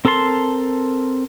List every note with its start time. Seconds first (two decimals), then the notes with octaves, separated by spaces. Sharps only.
0.05 C4 A4 A#4 A5 C6